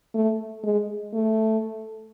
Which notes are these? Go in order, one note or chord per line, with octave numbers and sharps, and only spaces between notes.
A3
G#3
A3